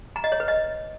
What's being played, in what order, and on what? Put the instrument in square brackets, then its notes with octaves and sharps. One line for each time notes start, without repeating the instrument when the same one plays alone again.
[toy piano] A#5
D#5
C#5
B4
D#5